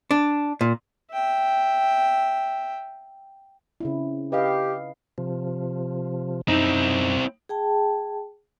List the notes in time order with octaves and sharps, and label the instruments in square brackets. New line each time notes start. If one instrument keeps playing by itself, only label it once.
[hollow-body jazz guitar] D4
A#2
[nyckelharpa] E5 G5
[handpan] C#3 C4 E4
[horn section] G4 [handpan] B4 D#5 F5
[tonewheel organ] C3 F3
[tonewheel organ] F#2 [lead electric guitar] C4 E4 [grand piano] D#4
[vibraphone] G#4 G5 A5